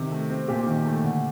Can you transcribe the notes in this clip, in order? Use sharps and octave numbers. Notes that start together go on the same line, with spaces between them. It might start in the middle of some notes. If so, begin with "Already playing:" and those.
Already playing: C3 D#3
A3
C4
A#2 G4
D#3
A3
D3